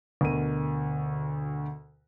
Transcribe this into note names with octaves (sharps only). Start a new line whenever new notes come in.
D2 B2 A#4 D#7